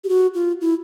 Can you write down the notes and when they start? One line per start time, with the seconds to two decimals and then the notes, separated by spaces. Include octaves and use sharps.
0.04 G4
0.09 F#4
0.35 F4
0.61 E4